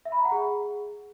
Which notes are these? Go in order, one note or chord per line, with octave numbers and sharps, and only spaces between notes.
E5
B5
A#5
F#5
G#4